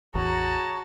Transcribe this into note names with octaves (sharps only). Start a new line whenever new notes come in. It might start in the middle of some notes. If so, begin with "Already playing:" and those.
A1 E2 F#4 G#4 C#5 A5 A#5